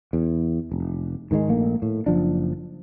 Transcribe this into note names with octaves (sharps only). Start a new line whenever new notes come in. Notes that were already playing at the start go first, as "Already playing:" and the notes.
E2
F1
G#2 D#3 E3 G#3
A#1 A3 A#3
A2
F#1 F3 D4